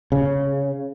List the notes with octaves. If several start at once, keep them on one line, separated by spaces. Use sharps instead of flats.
C#3